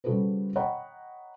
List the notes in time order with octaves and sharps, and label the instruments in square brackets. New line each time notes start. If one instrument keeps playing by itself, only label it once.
[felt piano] C#3 G3 F#4 A4 B4 C5
C#5 D#5 F#5 G5 A#5 B5